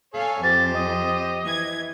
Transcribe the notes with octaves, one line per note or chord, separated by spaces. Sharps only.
A4 C#5 F5 G#5
F2 G4 C5 A6
D#5
E3 G#6